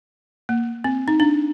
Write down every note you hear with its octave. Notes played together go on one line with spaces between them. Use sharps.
A#3
C4
D#4
D4